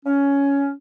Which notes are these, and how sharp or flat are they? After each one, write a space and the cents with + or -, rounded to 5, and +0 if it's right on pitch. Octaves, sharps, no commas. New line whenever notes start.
C#4 +10